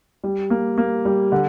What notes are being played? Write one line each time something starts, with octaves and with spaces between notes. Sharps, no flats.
G3
A#3
A#3
G3
D3